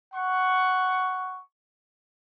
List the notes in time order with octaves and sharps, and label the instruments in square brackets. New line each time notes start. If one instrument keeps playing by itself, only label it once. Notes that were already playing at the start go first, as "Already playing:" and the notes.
[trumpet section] F#5 C#6